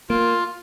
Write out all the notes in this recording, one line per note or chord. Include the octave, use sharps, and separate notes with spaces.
A#3 F4